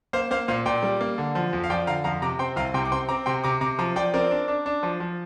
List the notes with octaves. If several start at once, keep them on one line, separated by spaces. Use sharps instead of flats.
A#3 C5 F5
A#3 C5 F5
A#2 C5 F5
A#2 D5 G5
G3
A#3
D3
F3
F2
F5
F3 D5 G5
D3 F5 A#5
F2 F5 A#5
C3 A#5 D6
C4 G5 C6
C2 F5 A#5
C3 G5 C6
D6
C4 G5 C6
C4 A#5 D6
C3 G5 C6
C3 A#5 D6
C3 A#5 D6
F3 A#5 D6
F3 D5 G5
C4 A#4 D5
D4
D4
D4
F3
F3